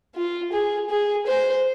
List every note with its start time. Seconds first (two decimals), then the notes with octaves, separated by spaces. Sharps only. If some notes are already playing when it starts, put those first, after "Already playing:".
0.16 F4
0.52 G#4
0.90 G#4
1.27 C5